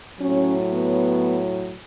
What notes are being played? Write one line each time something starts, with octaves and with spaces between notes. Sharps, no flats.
A2 F#3 C#4
B3